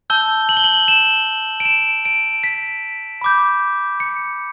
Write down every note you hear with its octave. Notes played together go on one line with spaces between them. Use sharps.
A5 E6 G6 G7
F#7
G7
F#7
E7
D7
E7
D7
B6
B5 D6 G6
C#7